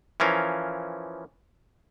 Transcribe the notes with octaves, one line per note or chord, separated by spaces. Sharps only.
E3 F3 C#4 A#4 F5